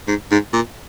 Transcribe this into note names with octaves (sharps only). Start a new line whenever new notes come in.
G#2
G#2
A#2